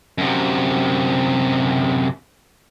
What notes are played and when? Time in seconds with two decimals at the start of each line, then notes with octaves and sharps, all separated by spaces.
0.18 F#2 C3